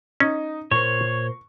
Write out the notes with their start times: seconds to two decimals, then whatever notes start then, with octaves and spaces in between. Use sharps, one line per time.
0.20 C#4 D#4
0.71 A#2 A#4 C5 C#5 C#6